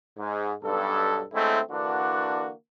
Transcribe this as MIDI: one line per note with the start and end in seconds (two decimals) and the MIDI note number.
0.18 0.53 44
0.64 1.24 35
0.64 1.24 43
0.64 1.24 69
1.34 1.60 50
1.34 1.60 56
1.34 1.60 57
1.34 1.60 60
1.34 1.60 61
1.34 1.60 64
1.71 2.51 50
1.71 2.51 52
1.71 2.51 58
1.71 2.51 62
1.71 2.51 66